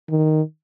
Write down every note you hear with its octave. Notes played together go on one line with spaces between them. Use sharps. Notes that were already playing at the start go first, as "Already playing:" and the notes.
D#3